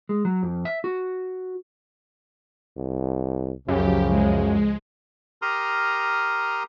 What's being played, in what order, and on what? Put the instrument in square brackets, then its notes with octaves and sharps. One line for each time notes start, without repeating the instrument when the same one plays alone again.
[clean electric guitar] G#3
F#3
F2
E5
F#4
[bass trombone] C2
[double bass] C#2 F3 [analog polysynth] F#2 [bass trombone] C#3 [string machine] G4
[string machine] G#3
[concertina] G4 A#4 A#5 C6 D#6 F6